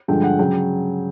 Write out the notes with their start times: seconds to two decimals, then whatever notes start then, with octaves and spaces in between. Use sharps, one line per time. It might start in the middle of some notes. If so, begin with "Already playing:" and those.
0.08 G2 D3 F3 G#3 G5
0.23 F#5
0.39 C#3 F#3 G5